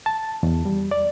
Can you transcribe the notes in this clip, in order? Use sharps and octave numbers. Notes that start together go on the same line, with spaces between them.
A5
E2
G3
D5